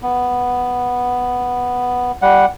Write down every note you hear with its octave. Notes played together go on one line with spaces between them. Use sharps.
B3
G3 F#5